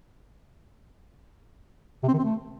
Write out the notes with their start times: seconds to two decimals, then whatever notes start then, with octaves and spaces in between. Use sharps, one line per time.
2.03 C3
2.08 C4
2.14 D#3
2.19 C4
2.24 A3